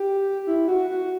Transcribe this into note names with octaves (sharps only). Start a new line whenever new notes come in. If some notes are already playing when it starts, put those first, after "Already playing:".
Already playing: G4
E4
F#4
F#4